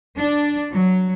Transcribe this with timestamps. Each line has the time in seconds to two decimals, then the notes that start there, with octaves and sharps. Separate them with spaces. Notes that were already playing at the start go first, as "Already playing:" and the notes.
0.18 D4
0.72 F#3